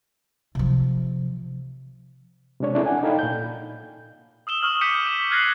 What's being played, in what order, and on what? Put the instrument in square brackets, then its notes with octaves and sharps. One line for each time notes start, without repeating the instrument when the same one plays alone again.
[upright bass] C3 F3
[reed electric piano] C3 G#3 D4 C#5
C#4 D4 E4 G#4 A4
D5 F#5 G#5
D#4 A4 F5 G5 A5 B5
A#2 G6
[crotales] D#6 E6 E7 G7
C#6 D#6 F6 F#7
D6 D#6 G6 B6 C#7 D#7
D#7 E7
F6 F#6 G#6 A#6 C7 F#7